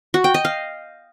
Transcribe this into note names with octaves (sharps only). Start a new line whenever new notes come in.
F#4
G5
D#5
F5